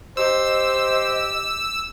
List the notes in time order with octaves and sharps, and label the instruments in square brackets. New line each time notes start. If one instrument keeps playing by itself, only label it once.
[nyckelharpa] G4 [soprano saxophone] C5 [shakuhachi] D#5 [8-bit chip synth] E6